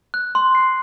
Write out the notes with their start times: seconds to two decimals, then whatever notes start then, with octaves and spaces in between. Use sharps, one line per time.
0.14 F#6
0.35 C6
0.55 C7